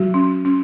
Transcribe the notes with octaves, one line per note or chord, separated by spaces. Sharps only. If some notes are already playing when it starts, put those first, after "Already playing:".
Already playing: F#3 F#4
C#4
C#4